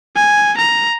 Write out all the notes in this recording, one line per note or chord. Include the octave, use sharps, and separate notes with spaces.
G#5
A#5